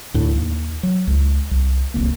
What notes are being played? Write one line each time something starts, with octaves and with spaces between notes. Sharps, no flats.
D2 A2
D#2
F#3
C#2
C2
D1 C2 A#3